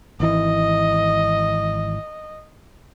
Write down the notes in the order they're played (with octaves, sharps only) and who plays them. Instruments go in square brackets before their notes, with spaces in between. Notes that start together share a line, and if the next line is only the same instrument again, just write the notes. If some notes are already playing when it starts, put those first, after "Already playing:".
[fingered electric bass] G#1 E3 [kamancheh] D#5